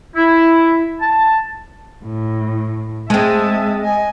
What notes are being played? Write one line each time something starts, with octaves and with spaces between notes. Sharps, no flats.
E4
A5
A2
G#3 C4 E5 A5 D#6
D#5 G#5